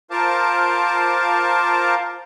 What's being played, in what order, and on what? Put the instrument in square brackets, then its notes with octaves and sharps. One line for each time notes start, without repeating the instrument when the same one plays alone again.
[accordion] F4 A#4 C5 F5 A5 D6